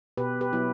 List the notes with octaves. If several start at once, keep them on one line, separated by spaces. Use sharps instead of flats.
B2 G4 B4
G4 B4
F#3 B3 E4